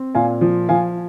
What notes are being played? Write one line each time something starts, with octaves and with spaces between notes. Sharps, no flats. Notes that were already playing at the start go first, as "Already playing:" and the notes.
Already playing: C4
A#2 F5 G#5
F3
F3 F5 G#5